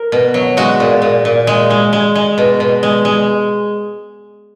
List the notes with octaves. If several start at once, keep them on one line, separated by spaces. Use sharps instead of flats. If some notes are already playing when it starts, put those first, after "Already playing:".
Already playing: A#4
B2
F#3
G#3 F#4
A#2
A#2
A#2
G#3
G#3
G#3
G#3
B2
B2
G#3
G#3